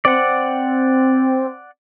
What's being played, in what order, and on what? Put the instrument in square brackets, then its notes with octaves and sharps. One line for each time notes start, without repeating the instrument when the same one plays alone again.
[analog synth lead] C4 [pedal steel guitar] D5 F#5